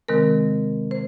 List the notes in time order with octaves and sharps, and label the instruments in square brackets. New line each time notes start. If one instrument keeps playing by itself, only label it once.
[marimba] C3 D#3 G#3 C4 A#4
C5